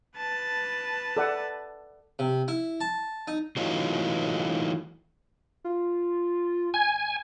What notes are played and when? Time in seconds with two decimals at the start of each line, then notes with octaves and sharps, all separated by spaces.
0.17 B4 A5
1.17 A4 D5 F#5
2.19 C3
2.48 E4
2.80 A5
3.27 D#4
3.56 E3 F#3 A3 D#4 F4
5.65 F4
6.74 G#5